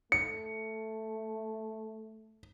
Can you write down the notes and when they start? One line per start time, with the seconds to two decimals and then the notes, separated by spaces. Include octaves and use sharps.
0.12 A3 C#7